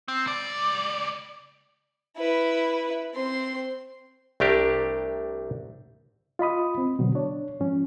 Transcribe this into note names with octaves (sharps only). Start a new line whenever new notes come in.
C4
C#2 D5
E4 B4
C4 C6
C2 A3 D4 G4 A#4
F4 D#5 B5 D#6
C4
B2 D3 F#3
D4 C#5
G#2 F3 C#4